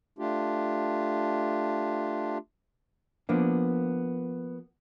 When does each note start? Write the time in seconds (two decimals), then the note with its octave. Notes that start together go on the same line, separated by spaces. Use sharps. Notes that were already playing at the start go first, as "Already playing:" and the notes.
0.19 A3 D4 F4 G4
3.29 F3 A#3 B3 D4